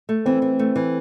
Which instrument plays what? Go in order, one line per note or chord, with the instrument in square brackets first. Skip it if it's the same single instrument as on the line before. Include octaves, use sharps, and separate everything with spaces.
[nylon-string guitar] A3
[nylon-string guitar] E3 [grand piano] C4
[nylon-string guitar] E3
A3
E3